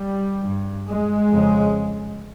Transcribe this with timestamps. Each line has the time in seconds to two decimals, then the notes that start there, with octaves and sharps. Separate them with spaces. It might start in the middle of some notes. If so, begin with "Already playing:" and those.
Already playing: G3
0.44 G2
0.88 G#3
1.31 F2 C#3